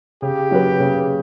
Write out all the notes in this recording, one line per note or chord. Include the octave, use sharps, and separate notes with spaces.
C#3 G4
F#3 C#4 F#4 B4
C#3